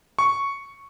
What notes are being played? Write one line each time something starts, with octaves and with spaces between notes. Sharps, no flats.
C#6